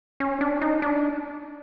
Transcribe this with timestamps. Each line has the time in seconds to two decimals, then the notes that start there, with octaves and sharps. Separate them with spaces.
0.20 C#4
0.41 D4
0.61 D#4
0.82 D4